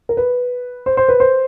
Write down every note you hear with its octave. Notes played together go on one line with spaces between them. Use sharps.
A#4
B4
C5
C5
B4
C5